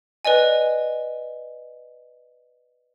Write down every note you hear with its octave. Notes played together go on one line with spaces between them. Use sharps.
B4 D5 D#5 G#5